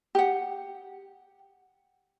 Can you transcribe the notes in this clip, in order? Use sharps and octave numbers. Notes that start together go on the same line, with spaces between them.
G4 F#5